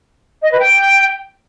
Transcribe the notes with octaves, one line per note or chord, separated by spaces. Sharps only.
D#5
B4
G5